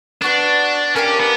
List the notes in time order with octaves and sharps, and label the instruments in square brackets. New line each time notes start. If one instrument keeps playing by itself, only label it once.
[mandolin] B3 F#4 B4 [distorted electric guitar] D4
[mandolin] A#3 D4 G4 [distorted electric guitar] C#4
[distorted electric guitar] B3